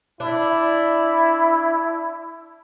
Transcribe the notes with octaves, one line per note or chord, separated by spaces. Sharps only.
D4 E4